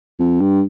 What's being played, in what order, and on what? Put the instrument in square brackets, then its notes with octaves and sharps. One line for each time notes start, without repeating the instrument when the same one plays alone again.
[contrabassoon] F2
G2